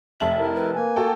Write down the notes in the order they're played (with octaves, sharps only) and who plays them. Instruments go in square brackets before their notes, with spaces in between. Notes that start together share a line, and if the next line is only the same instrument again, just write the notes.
[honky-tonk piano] F1 A5 F#7 [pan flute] E5
[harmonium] E4 A#4
[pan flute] B4
[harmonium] A#3 G#5
[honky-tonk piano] F#4 A4 G5